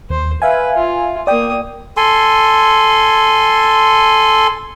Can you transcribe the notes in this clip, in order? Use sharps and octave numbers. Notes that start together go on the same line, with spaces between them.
D#2 C5
B4 E5 F5 G#5
F4
A#3 D5 G5 D#6
A4 G#5 C6